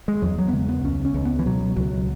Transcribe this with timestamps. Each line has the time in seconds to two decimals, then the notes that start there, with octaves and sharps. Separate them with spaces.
0.08 G#3
0.22 E2 F#3
0.38 F#3
0.48 B3
0.53 C#3 G#3
0.69 B3
0.84 C#2 C#4
1.05 C#4
1.14 C#2
1.25 B3
1.39 E3
1.46 B2 F#3
1.76 C#2 F#3